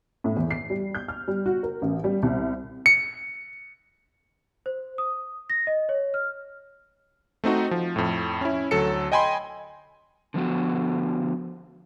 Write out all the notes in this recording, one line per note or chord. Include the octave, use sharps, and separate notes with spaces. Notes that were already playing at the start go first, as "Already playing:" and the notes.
A2
E2
C7
G3
G6
F6
G3
F#4
A#4
A1
G3
C2
C#7
C5
D#6
A#6
D#5
C#5
F6
A3 C4 D#4 F#4
F3
F2 A2
C#4 E4
D2 F#3 A4 C#7
D#5 G5 G#5 B5 C6
D3 F3 B3 F#4